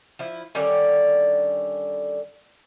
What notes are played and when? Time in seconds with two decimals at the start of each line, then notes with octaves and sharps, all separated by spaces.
0.19 F3 E4
0.55 D3 D#3 G3 C#4